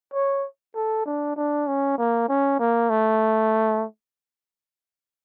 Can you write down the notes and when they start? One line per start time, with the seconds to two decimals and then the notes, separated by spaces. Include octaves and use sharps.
0.14 C#5
0.75 A4
1.06 D4
1.36 D4
1.67 C#4
1.98 A#3
2.29 C#4
2.59 A#3
2.90 A3